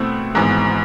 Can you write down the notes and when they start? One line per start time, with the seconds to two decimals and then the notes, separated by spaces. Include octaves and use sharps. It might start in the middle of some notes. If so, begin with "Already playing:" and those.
Already playing: B2 A3 C4 E4
0.35 G#1 G#2 E3 B3